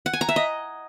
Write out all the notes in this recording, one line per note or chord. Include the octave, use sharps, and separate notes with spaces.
F#5
G#5
A#5
E5
D#5